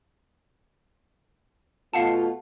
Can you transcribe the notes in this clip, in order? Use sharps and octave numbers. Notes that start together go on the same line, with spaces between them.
B2 A3 F4 F5 F#5 A5